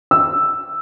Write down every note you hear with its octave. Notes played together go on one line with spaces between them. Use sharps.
E6